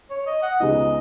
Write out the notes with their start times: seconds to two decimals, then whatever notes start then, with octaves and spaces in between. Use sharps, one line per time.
0.10 C#5
0.27 D#5
0.43 F#5
0.60 C#2 C#3 G#3 B3 D#4 D#5